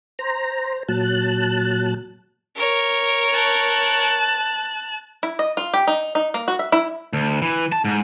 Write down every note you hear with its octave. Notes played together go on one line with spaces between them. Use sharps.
C5 A#5
A#2 F#3 A5 F#6
A#4 C#5
A5 F#6
E4
D#5
F4
G4
D#4
D#4
A#3
F#4
E5
E4
D2
E3
A5
G#2